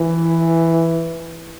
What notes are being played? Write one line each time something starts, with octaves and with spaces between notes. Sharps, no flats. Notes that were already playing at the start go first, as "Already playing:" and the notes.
Already playing: E3